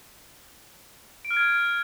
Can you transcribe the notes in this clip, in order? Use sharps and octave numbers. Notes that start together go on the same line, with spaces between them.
D7
F6
G#6